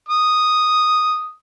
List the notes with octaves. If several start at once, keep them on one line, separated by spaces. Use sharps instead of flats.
D#6